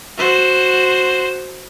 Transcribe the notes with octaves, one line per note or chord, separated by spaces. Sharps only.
F#4 C5